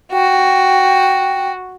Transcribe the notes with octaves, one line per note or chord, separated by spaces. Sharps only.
F#4 G5